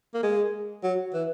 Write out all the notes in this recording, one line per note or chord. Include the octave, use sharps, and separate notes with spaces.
A#3
G#3
F#3
E3